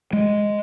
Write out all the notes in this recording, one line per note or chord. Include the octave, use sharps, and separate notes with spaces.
G#3